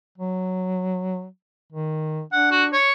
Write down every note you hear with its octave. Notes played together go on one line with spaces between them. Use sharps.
F#3
D#3
D4 F#5
F#4
C#5